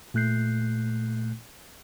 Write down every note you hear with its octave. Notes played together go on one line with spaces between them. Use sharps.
A#2 A3 F#6 G6 C7